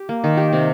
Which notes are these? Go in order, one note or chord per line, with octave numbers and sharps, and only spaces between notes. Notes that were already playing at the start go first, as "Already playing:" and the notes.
Already playing: G4
A#3
D#3
G4
C3